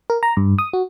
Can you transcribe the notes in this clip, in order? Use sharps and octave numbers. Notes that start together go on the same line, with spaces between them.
A#4
A#5
G2
D#6
F#4